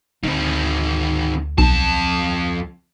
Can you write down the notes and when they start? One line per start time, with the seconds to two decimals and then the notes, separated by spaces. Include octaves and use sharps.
0.23 D2 D#3 C4
1.58 B1 F2 A5